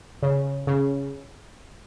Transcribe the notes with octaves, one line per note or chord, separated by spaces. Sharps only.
C#3
C#3